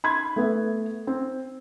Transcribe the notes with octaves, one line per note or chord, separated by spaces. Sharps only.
B5 C6 G#6
A3 B3 E5
C4